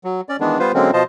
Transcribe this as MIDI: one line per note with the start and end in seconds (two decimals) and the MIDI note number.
0.04 0.21 54
0.29 0.37 61
0.29 0.37 74
0.41 0.58 51
0.41 0.58 52
0.41 0.58 56
0.41 0.58 59
0.41 0.58 62
0.59 0.72 55
0.59 0.72 59
0.59 0.72 65
0.59 0.72 71
0.59 0.72 72
0.74 0.91 50
0.74 0.91 54
0.74 0.91 56
0.74 0.91 58
0.74 0.91 60
0.74 0.91 61
0.93 1.03 47
0.93 1.03 53
0.93 1.03 65
0.93 1.03 72
0.93 1.03 75
0.93 1.03 81